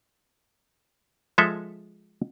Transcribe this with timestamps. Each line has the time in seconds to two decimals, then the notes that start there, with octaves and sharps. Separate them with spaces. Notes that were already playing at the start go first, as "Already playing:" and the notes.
1.38 F3 G#3 A4 E5